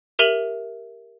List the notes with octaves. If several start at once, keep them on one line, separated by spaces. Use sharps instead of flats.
G4 A#4 E5 D#7 F7 F#7